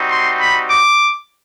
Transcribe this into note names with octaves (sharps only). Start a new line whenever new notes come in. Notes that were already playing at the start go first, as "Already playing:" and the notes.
Already playing: G3 C4 D#4 F#4
C6
B5
D6